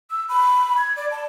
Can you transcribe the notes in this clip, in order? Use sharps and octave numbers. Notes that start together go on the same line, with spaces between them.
E6
B5
G#6
D5
A5